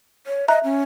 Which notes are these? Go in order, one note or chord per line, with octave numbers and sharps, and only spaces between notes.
C#5
D#5 E5 A#5 F#6
C#4